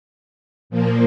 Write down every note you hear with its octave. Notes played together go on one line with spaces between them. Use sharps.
A#2 F3 A#3